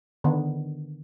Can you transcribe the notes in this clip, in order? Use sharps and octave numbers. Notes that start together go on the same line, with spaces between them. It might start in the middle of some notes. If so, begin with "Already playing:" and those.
D3 D#3 B3